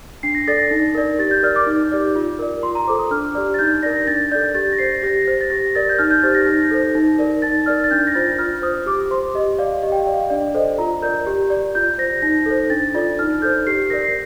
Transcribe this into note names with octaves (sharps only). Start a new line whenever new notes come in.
D4 C7
A#6
A4 D5 A6
A#6
D#4
A#4 D5
G4 A6
G6
A#4 D5 F6
D6
D#4
G4 D5
F4
A#4 D5
F4 C6
A#5
A4 C5 D6
D#6
D4 F6
G4 D5
A6
D#4 G6
A#4 D5 A#6
A#6
D4 A6
A4 D5 G6
G4 A6
A#6
C5 C7
G4 A#6
C5
A6
G4 A#6
A#4 D5 A6
G6
D#4 F6
G6
G4 C5 A6
A#6
D#4 A#6
A4 C5
D#4
A#4 D5
D#4 A6
A#4 D5 F6
A6
D4 G6
A#6
F4 C5 A6
F4 F6
C5 D#6
G4 D6
C5 C6
G4 D#5
D5 F5
G4 D#5
G5
F5
D5
F5
D4 D5
A4 C5 D#5
F4 A#5
A#4 D5 G6
G4
D5
F4 G6
C5 A#6
D#4 A#6
A4 C5
D4 A6
F4 A4 D5
D#4 F6
A4 C5 G6
G4 C7
A#4 D5 A#6
C7